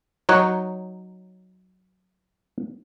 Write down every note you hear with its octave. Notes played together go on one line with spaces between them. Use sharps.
F#3 D#4 C#5 F#5